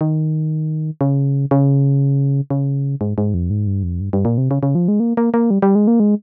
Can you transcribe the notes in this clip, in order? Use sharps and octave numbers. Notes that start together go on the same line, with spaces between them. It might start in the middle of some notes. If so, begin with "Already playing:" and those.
D#3
C#3
C#3
C#3
G#2
G#2
F2
G#2
G2
F2
G2
G2
A#2
C3
C#3
C#3
F3
G#3
A#3
A#3
A#3
G3
G3
G#3
A#3
G#3